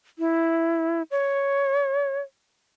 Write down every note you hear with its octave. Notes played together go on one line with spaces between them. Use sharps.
E4
C#5